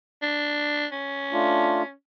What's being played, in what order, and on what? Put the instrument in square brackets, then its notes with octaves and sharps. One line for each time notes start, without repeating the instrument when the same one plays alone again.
[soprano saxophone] D4
C#4
[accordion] A3 D4 F4